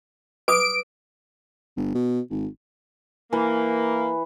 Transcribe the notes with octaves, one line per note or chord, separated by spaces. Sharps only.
B4 D6 D#6 D7
G1
B2
G#1
E3 A#3 B4